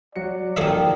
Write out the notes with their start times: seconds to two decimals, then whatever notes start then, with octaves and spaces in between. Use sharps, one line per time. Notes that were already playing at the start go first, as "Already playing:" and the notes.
0.16 F#3 F#4 D5 C#7
0.57 D#3 F3 A#3 G#4 A4 D#5 E5